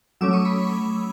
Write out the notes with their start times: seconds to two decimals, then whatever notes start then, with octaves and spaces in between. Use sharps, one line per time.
0.21 F#3 A3 C#4 D6 E6
0.33 C#6 D#6
0.45 B5 C#6